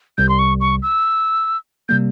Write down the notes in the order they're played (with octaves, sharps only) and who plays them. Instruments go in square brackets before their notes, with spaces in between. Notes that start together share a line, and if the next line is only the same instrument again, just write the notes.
[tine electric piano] C2 C3 G3 [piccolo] G6
[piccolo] C6
C#6
C#6
E6
[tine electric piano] C3 G3 A#3 [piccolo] G6